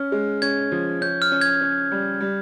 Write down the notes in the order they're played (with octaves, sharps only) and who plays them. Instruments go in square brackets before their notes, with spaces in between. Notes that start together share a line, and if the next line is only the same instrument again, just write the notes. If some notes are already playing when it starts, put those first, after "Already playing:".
Already playing: [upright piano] C#4 [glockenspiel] F6
[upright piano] G#3
[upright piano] C#4 [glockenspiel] G#6
[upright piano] F3
[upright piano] C#4 [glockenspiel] G6
[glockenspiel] F6
[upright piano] C#4
[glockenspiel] G#6
[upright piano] C#4
G3
G3